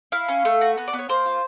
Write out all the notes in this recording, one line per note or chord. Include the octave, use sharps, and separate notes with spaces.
E4 F5
C#4
A3
F#4
B3
D5
B3
C#5
A#3 C5
F4